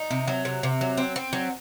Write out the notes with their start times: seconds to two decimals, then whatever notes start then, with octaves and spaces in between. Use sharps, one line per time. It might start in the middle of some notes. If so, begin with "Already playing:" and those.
Already playing: D#4
0.11 C3
0.28 F#3
0.45 C3
0.63 C3
0.81 F#3
0.97 C4
1.16 C4
1.33 F#3